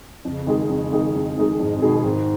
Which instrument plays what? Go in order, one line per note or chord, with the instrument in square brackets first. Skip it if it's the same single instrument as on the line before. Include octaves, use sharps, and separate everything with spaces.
[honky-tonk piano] F2 [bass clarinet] C#3
[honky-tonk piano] D#3 G#3 D#4 G#4
F2
D#3 G#3 D#4 G#4
F2
D#3 G#3 D#4 G#4
[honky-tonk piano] F2 [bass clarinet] G#2
[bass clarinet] B2 [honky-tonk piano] D#3 G#3 D#4 G#4
[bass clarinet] G#2 [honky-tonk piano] D#3